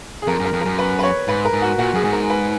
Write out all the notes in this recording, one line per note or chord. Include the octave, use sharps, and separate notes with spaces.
G#4
F2 A#4
F#2
A#4
F2
F#2 A#4
B4
B4
C#5
G#2 B4
A#4
G#2
F#4
A#2 F#4
F#2 G#4
G#2
A#4
B4